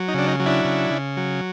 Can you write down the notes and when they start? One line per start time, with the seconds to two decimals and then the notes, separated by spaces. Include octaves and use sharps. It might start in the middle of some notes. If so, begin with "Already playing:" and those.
Already playing: F#3
0.08 D#4
0.14 C#3 D4
0.28 D#4
0.40 F#3
0.46 D4 E4
0.65 C#3
0.90 C#3
1.17 F#3